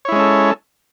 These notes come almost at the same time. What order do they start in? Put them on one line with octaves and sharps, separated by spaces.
C#5 E4 G#3 C#4 A4